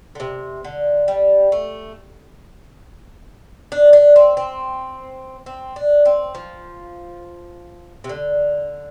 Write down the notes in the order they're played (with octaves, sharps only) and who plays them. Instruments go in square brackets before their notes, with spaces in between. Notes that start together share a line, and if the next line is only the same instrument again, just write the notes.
[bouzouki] D3
C3
D3
G3
A3
D4
D4
C4
C4
C4
D4
C4
F3
C3
D3